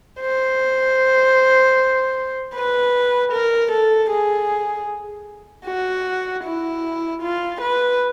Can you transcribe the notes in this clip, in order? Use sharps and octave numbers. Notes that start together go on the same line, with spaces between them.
C5
B4
A#4
A4
G#4
F#4
E4
F4
B4